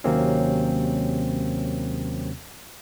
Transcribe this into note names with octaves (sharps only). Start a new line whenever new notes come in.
D#2 C3 F#3 A#3 C4 C#4